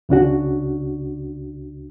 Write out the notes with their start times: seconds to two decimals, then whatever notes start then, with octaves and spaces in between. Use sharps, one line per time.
0.09 C#2 C#3 D4 F#4